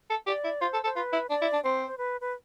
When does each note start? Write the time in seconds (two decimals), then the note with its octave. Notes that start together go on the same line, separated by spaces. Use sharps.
0.10 A4
0.27 G4 D5
0.44 E4
0.61 F4 C5
0.73 A4
0.84 A4 C5
0.96 F4 B4
1.13 E4
1.29 D4 D5
1.41 E4
1.53 D4
1.64 C4 C5
1.87 C5
1.98 B4
2.21 B4